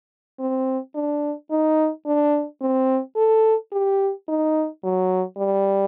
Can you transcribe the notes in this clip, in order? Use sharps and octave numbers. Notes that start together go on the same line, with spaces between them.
C4
D4
D#4
D4
C4
A4
G4
D#4
F#3
G3